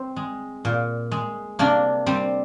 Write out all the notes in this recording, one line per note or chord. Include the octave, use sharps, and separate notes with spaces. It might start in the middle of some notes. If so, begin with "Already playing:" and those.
Already playing: C4
G#3
A#2
G#3
C3 A#3 D4
G3 C4